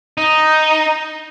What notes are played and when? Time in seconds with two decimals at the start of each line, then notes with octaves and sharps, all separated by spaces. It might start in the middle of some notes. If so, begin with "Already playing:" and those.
0.18 D#4